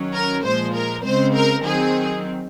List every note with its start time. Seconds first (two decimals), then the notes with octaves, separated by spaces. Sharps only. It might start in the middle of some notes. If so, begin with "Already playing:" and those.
Already playing: D#3 F#3 C#4
0.14 A#4
0.44 A#2 F3 G#3 C5
0.74 A#4
1.04 C#3 G#3 C4 C5
1.34 A#4
1.64 D#3 F#3 C4 G#4